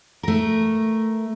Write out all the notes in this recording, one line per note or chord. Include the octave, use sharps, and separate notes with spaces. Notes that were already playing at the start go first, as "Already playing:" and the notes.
A3 A#4